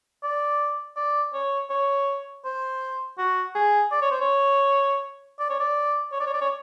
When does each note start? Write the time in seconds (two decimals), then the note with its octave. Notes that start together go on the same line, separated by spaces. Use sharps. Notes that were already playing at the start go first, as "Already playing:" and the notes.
0.23 D5
0.96 D5
1.34 C#5
1.70 C#5
2.45 C5
3.18 F#4
3.55 G#4
3.92 D5
4.02 C#5
4.11 C5
4.21 C#5
5.40 D5
5.50 C#5
5.60 D5
6.12 C#5
6.20 D5
6.26 C#5
6.34 D5
6.41 C#5